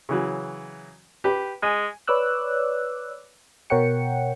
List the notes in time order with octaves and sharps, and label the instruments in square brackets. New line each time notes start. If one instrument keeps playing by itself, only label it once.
[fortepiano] C#3 E3 F#3
G4 B4
[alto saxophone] G#3 [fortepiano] G#5
[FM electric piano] B4 C#5 D5 D6 E6 F#6
B2 A#4 C#5 F#5 G5 C#7